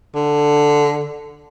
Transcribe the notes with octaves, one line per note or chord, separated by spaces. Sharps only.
D3